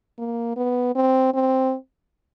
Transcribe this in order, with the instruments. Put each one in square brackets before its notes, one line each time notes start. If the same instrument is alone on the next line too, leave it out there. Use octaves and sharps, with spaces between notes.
[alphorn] A#3
B3
C4
C4